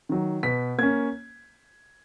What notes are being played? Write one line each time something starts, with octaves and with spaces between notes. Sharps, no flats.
D#3 F#3
B2 B6
A#3 C#4 G#6